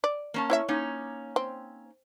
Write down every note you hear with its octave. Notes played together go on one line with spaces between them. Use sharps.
D5
A#3 C#4 A5
E4 C#5 E5
A#3 C#4 D#4
C4